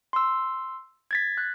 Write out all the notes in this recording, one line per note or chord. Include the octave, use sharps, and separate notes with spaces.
C6 E6
G#6 A6 B6
F#6